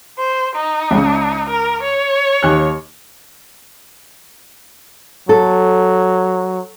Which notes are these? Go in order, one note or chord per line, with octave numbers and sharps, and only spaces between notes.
C5
D#4
C#2 C#3
A#4
C#5
D#2 F#6
F#3 A4